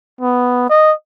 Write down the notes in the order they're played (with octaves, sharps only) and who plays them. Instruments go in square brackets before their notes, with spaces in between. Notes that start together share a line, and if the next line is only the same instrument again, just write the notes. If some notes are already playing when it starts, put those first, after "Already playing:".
[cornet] B3
D#5